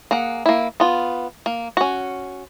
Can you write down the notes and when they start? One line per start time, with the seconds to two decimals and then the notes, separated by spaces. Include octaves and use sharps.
0.11 A#3 G#4 F#5
0.46 A#3 E4
0.80 B3 F4
1.46 A#3
1.77 C#4 F#4